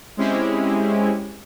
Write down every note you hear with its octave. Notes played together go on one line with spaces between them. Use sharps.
G#3 C4 C#4 E4 G4 G#4